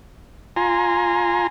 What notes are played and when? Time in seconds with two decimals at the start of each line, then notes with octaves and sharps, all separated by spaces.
0.56 F4 G#5 A#5 C6